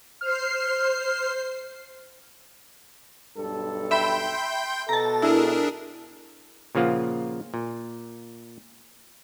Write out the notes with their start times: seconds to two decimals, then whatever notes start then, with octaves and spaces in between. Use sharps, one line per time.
0.21 C5 F6 C7
3.37 B1 G2 A4
3.91 E5 G5 B5 C6 G6
4.89 B2 A4 A5 A#5
5.22 D4 E4 G#4 A#4
6.75 A#2 C#3 F3 A#3 F4 F#5
7.54 A#2